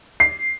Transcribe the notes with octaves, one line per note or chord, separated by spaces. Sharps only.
C7